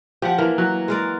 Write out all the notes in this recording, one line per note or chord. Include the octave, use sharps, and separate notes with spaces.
F3 G4 F#5
E3 A#3 A#4
F#3
G#3 A#4 D5